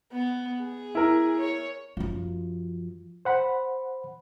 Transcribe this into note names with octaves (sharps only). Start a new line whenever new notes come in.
B3
G#4
E4 A#4
C#5
F#2 F3
C5 F#5 B5